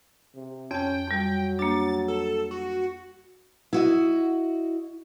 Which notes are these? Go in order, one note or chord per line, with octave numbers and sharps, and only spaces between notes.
C3
F2 C#4 G5 A5
F2 F#3 G3
A#3 D4 A6
A4
F#4
E4 F#4 D#5